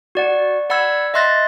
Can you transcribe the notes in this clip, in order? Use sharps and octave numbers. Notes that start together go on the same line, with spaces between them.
F#4 D5 F#5
D5 F#5 B5 E6 G#6
D#5 E5 C6 F#6 A6 A#6